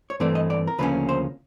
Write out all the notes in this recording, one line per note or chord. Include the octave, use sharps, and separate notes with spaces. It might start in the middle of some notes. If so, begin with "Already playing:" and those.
C#5
G2 E3 A3 C4 D5
D#5
D5
A#4
D2 C#3 F3 A#3 C#4 B4
C5